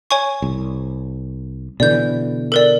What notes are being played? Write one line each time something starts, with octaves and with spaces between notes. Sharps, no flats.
C#5 G#5 C#6
C2
B2 D3 E3 D5 G6
A4 A#4 D5